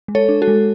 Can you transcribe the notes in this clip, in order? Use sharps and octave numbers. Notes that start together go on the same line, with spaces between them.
G#3
A4 C#5
D4
F#4 A4
G#3